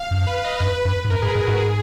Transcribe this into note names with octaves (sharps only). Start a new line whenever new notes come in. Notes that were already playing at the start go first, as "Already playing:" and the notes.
Already playing: F5
F#2
B4
D#5
F#2 B4
F#2
G#2 B4
F#2 A#4
G#2 G#4
G#2 G#4
G#2 F#4
G#4